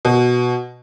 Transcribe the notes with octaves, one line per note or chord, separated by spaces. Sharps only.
B2